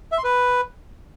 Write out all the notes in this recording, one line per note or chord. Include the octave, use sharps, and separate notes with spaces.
E5
C6
B4